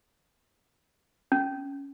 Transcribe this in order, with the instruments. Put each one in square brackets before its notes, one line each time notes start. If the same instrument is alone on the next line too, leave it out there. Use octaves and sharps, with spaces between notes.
[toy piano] C#4